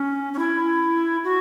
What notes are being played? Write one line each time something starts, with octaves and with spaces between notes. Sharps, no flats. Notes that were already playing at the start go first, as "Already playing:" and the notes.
Already playing: C#4
C#4
E4
F#4